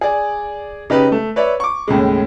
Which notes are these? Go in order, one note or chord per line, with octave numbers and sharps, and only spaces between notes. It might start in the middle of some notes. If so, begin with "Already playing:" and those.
G#4 D5
C#3 D#4 G4 B4
A3
B4 C#5 D5 E5
C#6 D6
D#2 A2 C#3 G#3